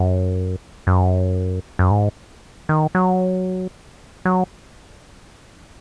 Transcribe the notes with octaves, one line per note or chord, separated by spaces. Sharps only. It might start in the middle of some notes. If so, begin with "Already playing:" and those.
Already playing: F#2
F#2
F#2
G#2
D#3
F#3
F#3